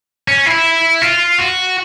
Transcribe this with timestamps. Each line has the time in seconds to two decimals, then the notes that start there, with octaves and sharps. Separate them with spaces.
0.28 C#4
0.46 E4
1.02 F4
1.39 F#4